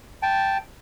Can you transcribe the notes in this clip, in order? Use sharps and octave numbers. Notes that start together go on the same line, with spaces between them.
G5 A5